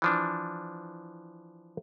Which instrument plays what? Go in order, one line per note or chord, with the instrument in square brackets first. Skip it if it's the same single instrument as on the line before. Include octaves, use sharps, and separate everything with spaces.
[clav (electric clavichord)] E3 F3 D4